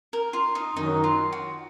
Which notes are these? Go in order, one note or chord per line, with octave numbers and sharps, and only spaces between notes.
A#4
F4
D#4
F#2 D#3 F#3 D#4
F4
F#4